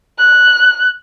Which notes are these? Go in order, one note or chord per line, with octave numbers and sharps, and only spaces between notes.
F#6